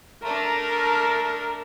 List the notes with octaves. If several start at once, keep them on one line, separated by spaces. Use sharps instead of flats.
A3 D4 A#4 A#5